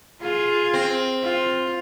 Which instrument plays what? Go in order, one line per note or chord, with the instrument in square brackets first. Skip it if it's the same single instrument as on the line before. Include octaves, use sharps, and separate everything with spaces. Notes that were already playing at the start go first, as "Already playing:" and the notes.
[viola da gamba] F4 G#4
[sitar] C4
[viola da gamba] F4